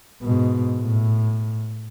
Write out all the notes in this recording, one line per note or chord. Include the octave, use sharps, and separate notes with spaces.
G#2 B2
A2